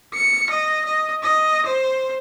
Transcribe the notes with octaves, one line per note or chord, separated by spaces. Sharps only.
C#7
D#5
D#5
D#5
C5